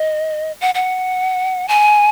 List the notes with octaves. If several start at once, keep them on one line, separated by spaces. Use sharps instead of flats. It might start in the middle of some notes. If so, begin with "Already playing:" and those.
Already playing: D#5
F#5
F#5
G#5